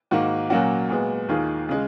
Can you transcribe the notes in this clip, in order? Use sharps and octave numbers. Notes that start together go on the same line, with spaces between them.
G#2 D#3 A#3 F#4
A#2 F#3 A#3 C#4 F#4
A#2 G#3 B3
D#2 D#3 A#3 F4 G#4
C#3 G#3